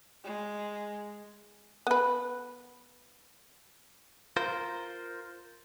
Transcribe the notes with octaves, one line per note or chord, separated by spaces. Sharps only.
G#3
B3 B4
F4 A#4 C5